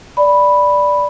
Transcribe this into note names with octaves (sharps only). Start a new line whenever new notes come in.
D5 B5